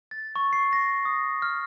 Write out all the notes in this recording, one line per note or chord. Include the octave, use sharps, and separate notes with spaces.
A6
C#6
C7
A#6
D#6
F6